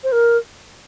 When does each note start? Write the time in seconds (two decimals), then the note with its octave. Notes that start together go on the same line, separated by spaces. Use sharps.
0.04 C5
0.12 A#4